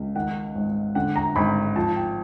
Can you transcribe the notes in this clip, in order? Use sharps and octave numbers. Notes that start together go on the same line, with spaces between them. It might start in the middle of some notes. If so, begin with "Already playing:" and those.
Already playing: C#2
D#3 F#5
G#1
D3 F#5
A#5
G#1 B5
F3 A5
G5